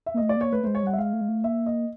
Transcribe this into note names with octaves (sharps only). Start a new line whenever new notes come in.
E5
A#3
A3 D#5
D5
A#3 C#5
A3 B4
G#3 A3 C5
C#5
G3 F#5
E5
G#3 F5
A3
G#3
A3
A#3 E5
D#5